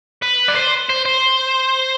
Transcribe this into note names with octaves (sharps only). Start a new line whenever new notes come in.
B4
D5
C5
C5
C5